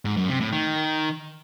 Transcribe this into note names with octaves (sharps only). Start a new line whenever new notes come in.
G#2
F#2
C3
A2
D#3